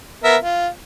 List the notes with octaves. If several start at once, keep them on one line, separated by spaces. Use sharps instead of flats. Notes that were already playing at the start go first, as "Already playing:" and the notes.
B3 A#4 E5
F4